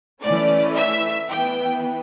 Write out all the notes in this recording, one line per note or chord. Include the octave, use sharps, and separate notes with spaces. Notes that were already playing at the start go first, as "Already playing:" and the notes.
E3 A3 C#4 D5
E5
E3 B3 G5